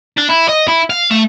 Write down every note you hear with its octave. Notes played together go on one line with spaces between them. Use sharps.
D4
E4
D#5
E4
F5
A3